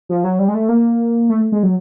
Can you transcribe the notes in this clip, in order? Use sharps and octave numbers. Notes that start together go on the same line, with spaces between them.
F3
F#3
G3
G#3
A3
A#3
A3
G#3
F#3